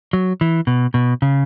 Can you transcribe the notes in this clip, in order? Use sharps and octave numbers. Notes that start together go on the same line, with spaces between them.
F#3
E3
B2
B2
C#3